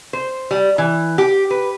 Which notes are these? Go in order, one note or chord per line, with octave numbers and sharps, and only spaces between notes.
C5
G3
E3
G4
B4